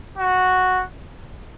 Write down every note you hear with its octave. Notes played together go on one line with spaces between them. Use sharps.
F#4